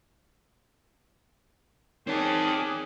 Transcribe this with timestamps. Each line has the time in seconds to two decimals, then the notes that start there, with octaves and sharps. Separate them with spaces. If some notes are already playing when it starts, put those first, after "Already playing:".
2.07 D#3 C4 G#4 C#5 D5 G5 A5 D6